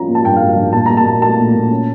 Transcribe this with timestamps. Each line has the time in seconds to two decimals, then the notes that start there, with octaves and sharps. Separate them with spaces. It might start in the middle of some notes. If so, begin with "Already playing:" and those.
Already playing: F3 C#4 A#5
0.08 A#3
0.15 A5
0.25 G2 G5
0.36 F5
0.40 G2
0.49 F5
0.57 F3
0.73 A#2 A5
0.86 A#2 A#5
0.97 A5
1.06 A#2
1.21 A3 A5
1.38 A#2
1.55 A#2
1.71 C#4